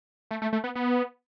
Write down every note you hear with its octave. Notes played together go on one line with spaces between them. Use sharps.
A3
A3
A3
B3
B3